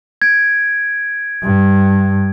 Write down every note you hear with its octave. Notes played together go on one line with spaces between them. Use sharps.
G#6 D7
G2